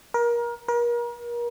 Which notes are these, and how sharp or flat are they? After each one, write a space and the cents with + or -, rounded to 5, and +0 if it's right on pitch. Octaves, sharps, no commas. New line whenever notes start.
A#4 +30
A#4 +35